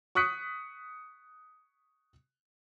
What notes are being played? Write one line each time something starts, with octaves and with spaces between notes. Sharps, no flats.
C#6 D#6 F#6 B6 C#7